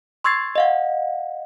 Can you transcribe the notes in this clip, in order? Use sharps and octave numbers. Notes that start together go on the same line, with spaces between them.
C6 C#6 E6 G#6 A6 C7
D#5 F5 F#5